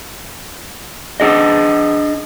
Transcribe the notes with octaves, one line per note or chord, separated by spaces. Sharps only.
D4 G#4 D#5